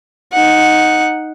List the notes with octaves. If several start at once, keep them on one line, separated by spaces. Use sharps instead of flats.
D#4 F#5